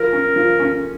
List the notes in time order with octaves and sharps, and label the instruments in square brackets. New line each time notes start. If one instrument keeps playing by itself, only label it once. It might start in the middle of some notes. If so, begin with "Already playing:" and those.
Already playing: [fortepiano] F3 [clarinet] A#4
[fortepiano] C#4
F3
C#4